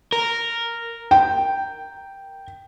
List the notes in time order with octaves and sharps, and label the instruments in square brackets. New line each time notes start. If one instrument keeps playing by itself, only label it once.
[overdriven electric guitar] A#4
[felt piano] G5